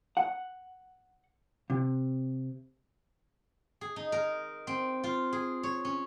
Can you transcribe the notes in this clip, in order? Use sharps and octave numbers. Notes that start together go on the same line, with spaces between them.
F#5
C3
G#4
D#4
A#4
C4
F4
G#4
C#5
C#4